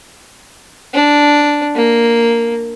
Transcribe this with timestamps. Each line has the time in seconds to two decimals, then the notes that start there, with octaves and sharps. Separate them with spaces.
0.94 D4
1.75 A#3